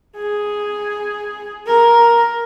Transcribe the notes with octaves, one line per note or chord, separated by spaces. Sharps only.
G#4
A#4